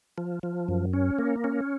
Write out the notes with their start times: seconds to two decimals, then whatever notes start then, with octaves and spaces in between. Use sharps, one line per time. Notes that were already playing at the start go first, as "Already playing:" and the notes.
0.18 F3
0.43 F3
0.68 F#2
0.93 C#4
1.19 A#3
1.44 C#4